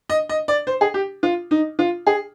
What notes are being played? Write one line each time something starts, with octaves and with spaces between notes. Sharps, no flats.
D#5
D#5
D5
C5
G#4
G4
F4
D#4
F4
G#4